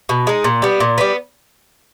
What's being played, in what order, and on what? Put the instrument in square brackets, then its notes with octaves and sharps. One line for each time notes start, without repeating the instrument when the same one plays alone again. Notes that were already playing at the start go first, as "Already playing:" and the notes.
[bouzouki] B2
G#3 D#4
A#2
G3 B3
A#2
G3 B3